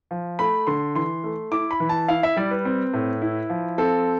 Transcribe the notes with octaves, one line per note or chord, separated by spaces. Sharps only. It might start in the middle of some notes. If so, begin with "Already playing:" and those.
F3
A3 B5
D3 C6
E3 C6
A3
E4 D6
B5
E3
A5
E4 F5
E5
G3 D5
B4
C4
A2
E4
F3
C4 A4